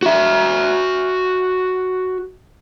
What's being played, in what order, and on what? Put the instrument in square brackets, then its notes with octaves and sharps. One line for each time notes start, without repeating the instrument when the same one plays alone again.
[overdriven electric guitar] F#4 E5